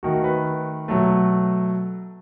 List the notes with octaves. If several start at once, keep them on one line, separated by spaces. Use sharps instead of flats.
D#3 A3 F#4
B4
B2 F#3 A3